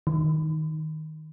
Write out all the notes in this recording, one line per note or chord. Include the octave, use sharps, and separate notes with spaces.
D#3